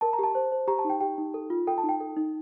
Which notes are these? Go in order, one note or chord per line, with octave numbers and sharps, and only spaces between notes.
A#4 A5
A#5
G4 A5
C5
C5
G4 A#5
A5
D#4
G5
G4 G5
D#4
A4
F4
A4 G5
A5
D#4
G5
A4
D#4